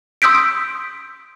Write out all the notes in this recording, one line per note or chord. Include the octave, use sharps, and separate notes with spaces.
C6 D#6 E6 G6 B6 D7